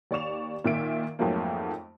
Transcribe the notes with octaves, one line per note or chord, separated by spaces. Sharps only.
D#2 D5 C#6 E7 F7
A#2 D#3 E5 D7
F2 G#2 F3 F#3 A3 A#3